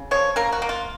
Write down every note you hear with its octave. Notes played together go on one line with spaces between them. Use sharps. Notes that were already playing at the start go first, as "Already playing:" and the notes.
Already playing: C#3
F3 C#5
A#3 A#4
F#4
A#3
F4